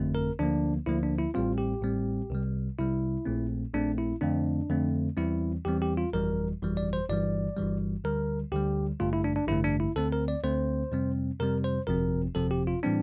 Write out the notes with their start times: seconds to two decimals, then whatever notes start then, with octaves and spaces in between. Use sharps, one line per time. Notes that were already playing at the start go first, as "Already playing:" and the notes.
Already playing: G1 F2 D3 A3 C4
0.15 A#4
0.39 D2 D3 F3 A#3 D4
0.86 D2 D3 F3 A#3 E4
1.03 D4
1.19 E4
1.34 A1 A2 G3 C4 F4
1.58 G4
1.82 A1 A2 G3 C4
2.30 C2 C3 G3
2.78 C2 C3 G3 E4
3.25 A#1 A#2 A3 C4
3.73 A#1 A#2 A3 C4 D4
3.98 E4
4.21 F2 D3 A3 C4 D4
4.69 F2 D3 A3 C4
5.17 E2 E3 G3 C4 E4
5.65 E2 E3 G3 C4 G4
5.82 G4
5.97 F4
6.13 G1 F2 E3 G3 A#4
6.61 G1 F2 E3 G3
6.77 D5
6.93 C5
7.09 G1 G2 E3 G3 D5
7.57 G1 G2 E3 G3
8.04 D2 D3 G3 A#4
8.52 D2 D3 G3 G4
9.00 A1 G2 D3 A3 F4
9.13 E4
9.24 D4
9.36 D4
9.48 A1 G2 D3 A3 E4
9.64 D4
9.80 E4
9.96 D2 D3 A3 C4 A4
10.12 A#4
10.28 D5
10.44 D2 D3 A3 C4 C5
10.92 F2 C3 G3 C4
11.40 F2 C3 G3 C4 A#4
11.64 C5
11.87 G1 F2 C3 F3 C4 A#4
12.35 G1 F2 C3 F3 C4 A4
12.51 G4
12.67 F4
12.83 A2 E3 G3 C4 D4